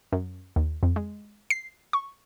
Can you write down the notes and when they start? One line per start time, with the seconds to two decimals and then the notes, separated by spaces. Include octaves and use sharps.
0.13 F#2
0.56 D#2
0.83 F2
0.96 G#3
1.50 C7
1.93 C#6